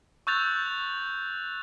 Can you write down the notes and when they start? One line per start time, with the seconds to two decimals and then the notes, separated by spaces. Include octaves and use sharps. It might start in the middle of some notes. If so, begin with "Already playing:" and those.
0.27 C#6 E6 F#6 G6 A6 F7